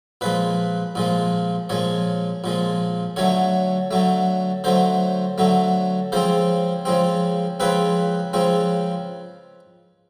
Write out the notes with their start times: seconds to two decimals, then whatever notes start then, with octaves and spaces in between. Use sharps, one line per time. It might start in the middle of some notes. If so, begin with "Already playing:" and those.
0.21 A#2 F3 G#3 B4
0.95 A#2 F3 G#3
1.69 A#2 F3 G#3 C#5
2.44 A#2 F3 G#3
3.16 D3 F#3 A3 C#5
3.91 D3 F#3 A3
4.64 D3 F#3 A3 C5
5.38 D3 F#3 A3
6.12 C#3 F3 G#3 C4 C5
6.85 C#3 F3 G#3 C4
7.60 C#3 F3 G#3 C4 B4
8.33 C#3 F3 G#3 C4